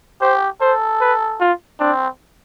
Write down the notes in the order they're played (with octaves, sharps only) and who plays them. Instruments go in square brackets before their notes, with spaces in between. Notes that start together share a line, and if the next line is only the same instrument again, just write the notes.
[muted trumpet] G4 [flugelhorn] C5
[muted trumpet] A4 [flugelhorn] C5
[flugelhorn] B4
F4
[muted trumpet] C4 [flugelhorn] D4